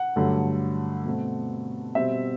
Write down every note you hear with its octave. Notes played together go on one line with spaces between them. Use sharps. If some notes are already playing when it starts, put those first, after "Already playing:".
Already playing: F#5
G2 D3 F#3 A3
B2 A3 C4
B2 G3 C4 E5